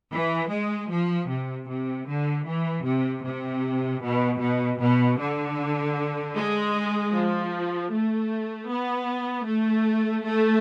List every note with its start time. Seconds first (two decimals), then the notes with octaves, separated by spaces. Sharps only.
0.12 E3
0.51 G#3
0.90 F3
1.29 C3
1.68 C3
2.07 D3
2.46 E3
2.85 C3
3.24 C3
4.01 B2
4.40 B2
4.80 B2
5.19 D3
6.35 G#3
7.12 F3
7.91 A3
8.68 B3
9.46 A3
10.23 A3